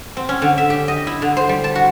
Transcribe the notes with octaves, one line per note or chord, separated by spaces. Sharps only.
C4
C#4
D3
E5
G4
D#5
E4
D3
C5
G3
A5
F#4